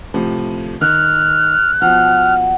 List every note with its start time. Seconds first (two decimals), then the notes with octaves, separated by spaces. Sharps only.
0.14 A2 C3 F3
0.81 D#3 F6 F#6
1.82 B2 F3 F#5 F6